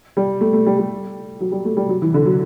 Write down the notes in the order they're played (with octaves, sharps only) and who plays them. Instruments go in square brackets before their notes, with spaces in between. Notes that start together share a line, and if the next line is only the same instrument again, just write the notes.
[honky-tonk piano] G3
A3
A3
G3
G3
F#3
G3
A3
G3
F#3
E3
D3
F#3